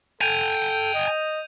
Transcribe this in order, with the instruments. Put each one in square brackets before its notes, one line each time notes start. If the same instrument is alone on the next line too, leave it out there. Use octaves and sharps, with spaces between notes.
[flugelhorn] A4 [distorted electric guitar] G5 G#5 [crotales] G6 D#7 F7
[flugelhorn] D#5